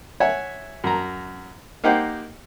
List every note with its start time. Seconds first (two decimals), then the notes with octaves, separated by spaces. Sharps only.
0.20 C#5 E5 F#5 G#5
0.84 F#2 A#5
1.84 A#3 D#4 G4 C5 F#5